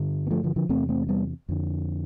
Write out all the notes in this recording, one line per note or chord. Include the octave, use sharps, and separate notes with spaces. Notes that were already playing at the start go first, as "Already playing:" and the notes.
Already playing: G2 D3
B3
F3 A3
D3 F3
D3 F3
E2 C3 A3 C4
A3 C4
G3 B3
F2 D3